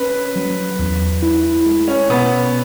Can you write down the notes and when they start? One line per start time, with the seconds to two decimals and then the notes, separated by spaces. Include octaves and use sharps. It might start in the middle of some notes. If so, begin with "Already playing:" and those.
Already playing: C#4 B4
0.36 F#3
0.79 E2
1.22 E4
1.66 G#3
1.88 C#4
2.09 B2 B3